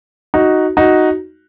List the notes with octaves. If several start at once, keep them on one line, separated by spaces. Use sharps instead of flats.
D#4 F#4
D#4 F#4